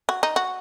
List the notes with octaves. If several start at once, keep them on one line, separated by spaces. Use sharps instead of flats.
F#4
D#4
F#4